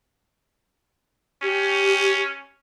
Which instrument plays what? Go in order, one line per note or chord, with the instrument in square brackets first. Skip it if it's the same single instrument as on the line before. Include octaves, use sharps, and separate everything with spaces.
[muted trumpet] C#4 [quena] G4